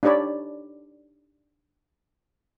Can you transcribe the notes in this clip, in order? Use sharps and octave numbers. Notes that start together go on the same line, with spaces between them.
D4 D#4 G4 C#5 D5 B5